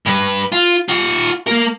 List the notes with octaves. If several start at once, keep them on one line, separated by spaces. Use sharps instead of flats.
G2 B4
F4
F4 F#5
A#3 A#4